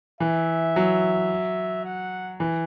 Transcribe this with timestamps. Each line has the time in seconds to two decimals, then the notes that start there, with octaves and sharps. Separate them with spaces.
0.20 E3 E5
0.76 F#3
1.85 F#5
2.40 E3